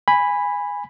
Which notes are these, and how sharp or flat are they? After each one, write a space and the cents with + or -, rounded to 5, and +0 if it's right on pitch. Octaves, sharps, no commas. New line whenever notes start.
G#5 -15 B5 +0